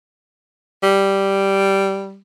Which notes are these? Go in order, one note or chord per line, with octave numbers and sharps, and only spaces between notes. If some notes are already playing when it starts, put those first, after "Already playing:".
G3